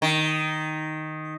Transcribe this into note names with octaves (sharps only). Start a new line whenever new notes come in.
D#3